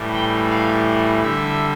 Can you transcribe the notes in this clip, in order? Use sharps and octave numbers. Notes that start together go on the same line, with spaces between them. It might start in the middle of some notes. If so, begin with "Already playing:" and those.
Already playing: A2 E3 G3
G5
F5
D3 G3 E5